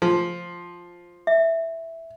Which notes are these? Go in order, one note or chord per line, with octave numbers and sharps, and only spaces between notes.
F3
E5